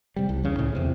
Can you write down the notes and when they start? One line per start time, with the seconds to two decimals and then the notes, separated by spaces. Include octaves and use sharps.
0.16 C3 G3
0.29 C2
0.43 E2 C#3
0.58 C#2 A2 C#3 E3
0.75 E2 C3